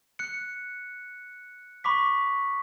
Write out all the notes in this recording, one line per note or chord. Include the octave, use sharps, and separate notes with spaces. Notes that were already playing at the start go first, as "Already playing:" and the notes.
F#6 C#7
B5 C#6 D6 B6